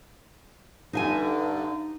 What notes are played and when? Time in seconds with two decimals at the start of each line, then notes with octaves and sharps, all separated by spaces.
0.93 G2 D3 D#4 E5 G#5